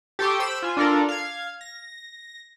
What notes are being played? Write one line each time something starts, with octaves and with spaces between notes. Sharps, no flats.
G4 A4 G5 C6 C#6 D#6
C5 B5 E6 D7 E7
F4 G#5
D4 F4 A4 A#4 D5
F5 G#6
A#6